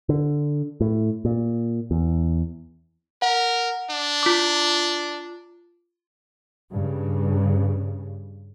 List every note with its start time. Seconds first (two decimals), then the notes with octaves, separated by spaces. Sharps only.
0.09 D3
0.81 A2
1.25 A#2
1.91 E2
3.22 A#4 F#5
3.90 D4
4.23 F4 D6
6.70 G2 C#3